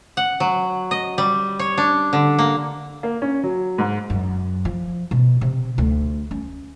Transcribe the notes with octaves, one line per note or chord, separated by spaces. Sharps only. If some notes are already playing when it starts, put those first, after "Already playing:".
F#5
F#3
D#5
G3
C#5
D4
D3
A#3
A#3
C#4
F#3
G#2
F#2
F3
B2
C3
D2
C#4